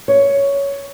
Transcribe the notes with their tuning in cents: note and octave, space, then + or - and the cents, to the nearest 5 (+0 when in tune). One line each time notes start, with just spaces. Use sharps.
C#5 +10